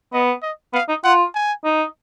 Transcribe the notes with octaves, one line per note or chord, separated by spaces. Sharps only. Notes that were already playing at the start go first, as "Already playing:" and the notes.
B3 D#5
D#5
B3 F5
D#4
F4 F#5
G#5
D#4